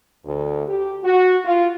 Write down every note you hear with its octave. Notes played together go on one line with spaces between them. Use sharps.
D2
G4
F#4
F4